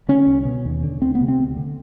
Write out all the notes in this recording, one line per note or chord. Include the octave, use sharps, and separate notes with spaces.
D3 C#4
C2
B2
D#2
D3
D2 C4
B3
C3
C4
D2
D3